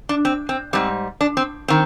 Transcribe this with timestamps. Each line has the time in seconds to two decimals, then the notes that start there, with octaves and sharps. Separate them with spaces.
0.09 D4
0.25 C4
0.49 C4
0.73 G#2 G3 C4
1.21 D4
1.37 C4
1.68 D#3 C4